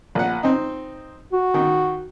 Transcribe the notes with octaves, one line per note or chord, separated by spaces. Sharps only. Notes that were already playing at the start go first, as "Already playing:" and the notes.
A#1 F#5
C4 D#4
F#4
D#3